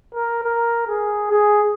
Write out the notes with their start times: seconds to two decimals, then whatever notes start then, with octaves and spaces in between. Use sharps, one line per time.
0.14 A#4
0.44 A#4
0.87 G#4
1.31 G#4